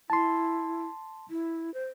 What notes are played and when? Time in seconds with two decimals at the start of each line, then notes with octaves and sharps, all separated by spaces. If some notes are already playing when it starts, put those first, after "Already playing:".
0.10 E4 A5 C6
1.30 E4
1.74 C5